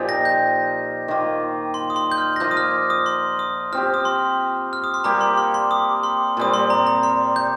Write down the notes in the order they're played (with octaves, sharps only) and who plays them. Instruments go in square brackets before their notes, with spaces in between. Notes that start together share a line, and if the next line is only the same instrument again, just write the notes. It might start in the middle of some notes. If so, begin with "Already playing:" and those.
Already playing: [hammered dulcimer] A#2 F3 D#4 G4
[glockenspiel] A#6
G6
[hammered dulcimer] D#3 A#3 F4
[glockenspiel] C6
D#6
C6
G6
F6
A#6
[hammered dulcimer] F3 A#3 F4 [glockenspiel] G6
[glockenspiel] D#6
F6
D#6
C6
D#6
[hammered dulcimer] F3 C4 G4 [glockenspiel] F6
[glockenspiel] D#6
C6
F6
D#6
C6
[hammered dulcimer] G3 A#3 G4 [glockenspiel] A#5
[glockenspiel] C6
C6
C6
D#6
C6
[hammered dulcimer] A#2 G3 C4 [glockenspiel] D#6
[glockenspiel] C6
A#5
A#5
C6
G6